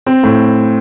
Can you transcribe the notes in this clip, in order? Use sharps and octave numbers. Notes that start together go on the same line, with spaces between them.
C4
A2